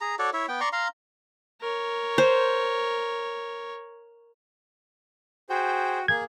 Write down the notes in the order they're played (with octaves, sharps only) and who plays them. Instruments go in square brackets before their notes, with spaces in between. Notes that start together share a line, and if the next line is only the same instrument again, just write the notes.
[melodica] G#4 A#5
F#4 A4 C#5 D5
E4 C#5 E5
B3 G5
D5 A#5 C6 C#6
F5 A#5 C6
[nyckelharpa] A#4 C#5
[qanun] C5
[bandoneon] F#4 [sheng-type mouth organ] G#4 C5 [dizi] G5
[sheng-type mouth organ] A#3 G#4 [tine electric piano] G#6